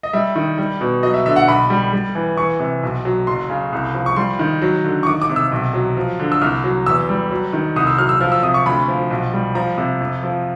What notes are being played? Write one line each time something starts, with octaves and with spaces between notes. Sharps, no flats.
D#5
G3 E5
D#3
G3
B2
F#3 D#5
E5
D3 E5
F#5
B1 B5
G3
G3
E3
E3 C#6
C3
B1
F#3
F#1 C6
C#3
C2
F3
C#6
G3 C6
D#3
F#3
D3
C#6
D#3 D6
D6
C3
E6
B1
F#3
F3
D3
E6
C2 F6
F#3
E2 E6
G3
F#3
D#3
C2 D#6
E6
F#3 F6
E6
F3 F6
E6
C3 D#6
C#6
D2 B5
F3
B1
G3
F3 A#5
C3
F2
F3